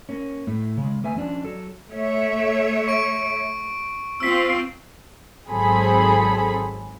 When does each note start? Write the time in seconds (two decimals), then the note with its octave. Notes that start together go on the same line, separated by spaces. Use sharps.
0.09 A#3 C#4
0.47 A2 A3
0.77 C#3 G#3
1.04 A3 B4 E5 G#5
1.16 F3 C#4 D4
1.44 F#3 A4
1.91 A3 C#5 E5
2.88 C#6 D7
4.20 C4 F4 E6 B6
5.49 G#1 F#3 C4 G#4 A4 B5